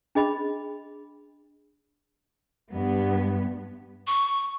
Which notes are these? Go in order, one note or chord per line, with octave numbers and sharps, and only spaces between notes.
D4 G#4 D#5 B5
G2 B3
C#6